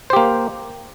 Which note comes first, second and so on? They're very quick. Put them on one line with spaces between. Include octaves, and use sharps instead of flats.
C5 G4 A#3